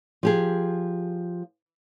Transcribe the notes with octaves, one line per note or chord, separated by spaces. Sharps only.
F3 G4 G#4